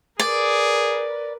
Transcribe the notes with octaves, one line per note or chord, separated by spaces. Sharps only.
G#4 A#4 B4 D5